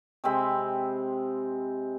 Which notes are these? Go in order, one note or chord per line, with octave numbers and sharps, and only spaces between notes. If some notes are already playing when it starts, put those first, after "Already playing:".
C3 G#3 C4 B5